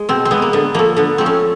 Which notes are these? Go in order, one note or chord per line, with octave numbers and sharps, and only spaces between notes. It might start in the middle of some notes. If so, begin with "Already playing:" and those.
Already playing: G#3
B2 C4
C4
G#3 B3
A#3
D3 B3
F3 A3 A#3
D3 B3
F3 A3 C4
C#4